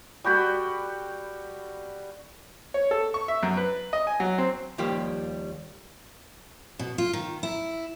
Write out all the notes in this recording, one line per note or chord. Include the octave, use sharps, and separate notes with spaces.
G3 F#4 G5 B5
C#5
A4
C#6
E5
F#2
B4
D#5
G#5
F#3
C4
D#2 F3 G3 A#3 G4
B2
F4
D#3
E4